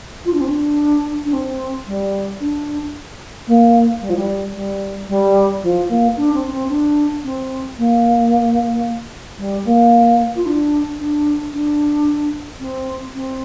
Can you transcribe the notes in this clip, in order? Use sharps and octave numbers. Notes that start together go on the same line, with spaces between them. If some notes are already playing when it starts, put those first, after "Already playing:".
F4
D4
C4
D4
D4
C4
G3
D4
A#3
G3
F3
G3
G3
G3
F3
A#3
D4
C4
C4
D4
C4
A#3
G3
A#3
F4
D4
D4
D4
C4
C4